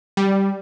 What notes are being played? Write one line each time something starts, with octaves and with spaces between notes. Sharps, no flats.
G3